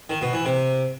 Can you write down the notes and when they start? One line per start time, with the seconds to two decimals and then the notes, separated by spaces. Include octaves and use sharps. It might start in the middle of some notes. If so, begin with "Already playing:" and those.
0.10 D#3
0.21 B2
0.33 E3
0.45 C3